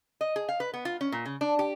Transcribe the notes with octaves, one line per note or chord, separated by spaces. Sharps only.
D#5
G#4
F5
B4
B3
F4
C#4
A#2
C#3
D4
G4